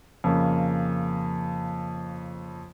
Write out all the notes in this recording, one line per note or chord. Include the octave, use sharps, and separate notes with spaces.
F2 C#3 A#3